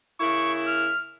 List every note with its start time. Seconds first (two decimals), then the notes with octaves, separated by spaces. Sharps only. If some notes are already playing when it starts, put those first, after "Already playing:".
0.20 C#3 A#3 E4 C#6
0.67 F6